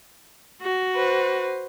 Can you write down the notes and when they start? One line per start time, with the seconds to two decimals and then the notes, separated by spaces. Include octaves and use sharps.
0.61 F#4
0.93 B4 C5